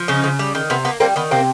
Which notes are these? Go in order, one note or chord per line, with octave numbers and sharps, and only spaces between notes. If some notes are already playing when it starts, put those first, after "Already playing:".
Already playing: F3
C#3 C#4 D#4
C#3
G3
D#3
C3 B3
A#3 B3
G3 A#3 C4
D#3 B3
C3 A#3 C4